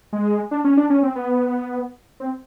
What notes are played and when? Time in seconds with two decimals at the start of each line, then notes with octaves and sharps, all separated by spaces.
0.13 G#3
0.51 D4
0.64 C#4
0.77 D4
0.90 C#4
1.03 C4
1.15 B3
2.20 C4